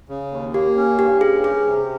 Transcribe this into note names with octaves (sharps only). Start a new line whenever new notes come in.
C#3
D#2
A#3 G4
C#4
G2 G4
C#4 G#4
G4 G#4
C3